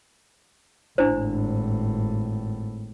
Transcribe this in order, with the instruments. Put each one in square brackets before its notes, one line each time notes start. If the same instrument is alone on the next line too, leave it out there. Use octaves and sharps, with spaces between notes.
[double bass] G#1 A2 [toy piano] D4 E4 C5